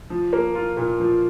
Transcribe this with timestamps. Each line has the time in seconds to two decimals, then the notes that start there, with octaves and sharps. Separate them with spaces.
0.10 F3
0.33 A#3
0.55 F4
0.77 A#2
1.00 F3